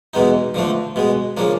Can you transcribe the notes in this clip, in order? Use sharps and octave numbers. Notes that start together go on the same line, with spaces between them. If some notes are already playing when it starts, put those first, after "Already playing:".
E2 B2 G#3 B3 D#4
D3 F3 A3 D4
B2 G#3 B3
C#3 F3 A#3 D4